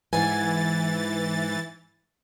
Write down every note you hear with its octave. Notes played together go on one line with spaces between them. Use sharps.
G#2 E3 G#5 A6